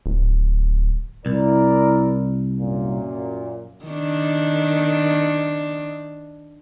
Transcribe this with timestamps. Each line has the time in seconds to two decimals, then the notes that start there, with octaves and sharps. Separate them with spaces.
0.06 D1
1.26 C2 E4 A#4 D5
2.59 F#2 A#2
3.85 D#3 D4